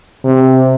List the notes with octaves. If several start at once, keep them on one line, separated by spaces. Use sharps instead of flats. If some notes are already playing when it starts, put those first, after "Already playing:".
C3